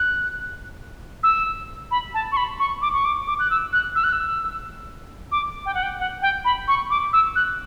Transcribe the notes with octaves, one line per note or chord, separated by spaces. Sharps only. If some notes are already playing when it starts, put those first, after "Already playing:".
Already playing: F#6
E6
B5
A5
C#6
B5
C#6
D6
C#6
D6
D6
F#6
E6
F#6
E6
F#6
E6
D6
G5
F#5
G5
F#5
G5
B5
C#6
D6
E6
F#6